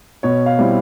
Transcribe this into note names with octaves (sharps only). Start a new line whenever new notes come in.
B2 C#5
F5
G3 C4 E4